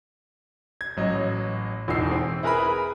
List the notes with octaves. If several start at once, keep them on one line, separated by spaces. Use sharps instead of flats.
G#6
A1 F#3 D#5
E1 E2 E3 D#4 E6 C7
C4
E4 G#4 A#4 B4 G#5 B5